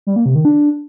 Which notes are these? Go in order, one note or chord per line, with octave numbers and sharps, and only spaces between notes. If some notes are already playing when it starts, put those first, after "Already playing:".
G3
A#3
C3
D#3
D4